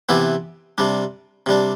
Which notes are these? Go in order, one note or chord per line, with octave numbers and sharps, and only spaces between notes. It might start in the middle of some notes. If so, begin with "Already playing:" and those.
C3 E3 B3 E4 G4
C3 G3 D4
C3 G3 D4